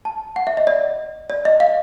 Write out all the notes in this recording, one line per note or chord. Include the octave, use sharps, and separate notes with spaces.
A5
F#5
E5
D#5
D5
D5
D#5
F5